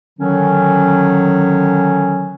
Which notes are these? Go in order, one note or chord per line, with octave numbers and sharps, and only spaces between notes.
D3 D#3 F#3 C#4